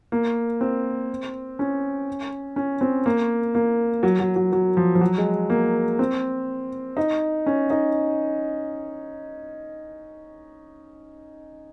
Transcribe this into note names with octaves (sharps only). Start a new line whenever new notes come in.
A#3
C4
C#4
C#4
C4
A#3
A#3
F#3
F#3
F#3
F#3
F3
F3
F#3
G#3
A#3
C4
D#4
C#4
D#4